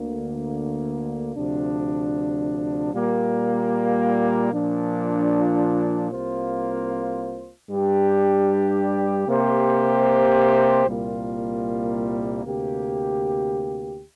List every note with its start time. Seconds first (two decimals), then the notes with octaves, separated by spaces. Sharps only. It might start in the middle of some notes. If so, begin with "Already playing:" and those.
Already playing: D2 D3 A#3
1.35 D2 C3 F3 D4
2.93 A#2 G3 A#3
4.52 A#2 F3 D4
6.11 C2 C3 A#3 F4 C5
7.69 G2 G3 D4 G4
9.28 C3 A#3 G4 C5
10.86 C2 A#2 G3 A#3 F4
12.45 D2 C3 A#3 G4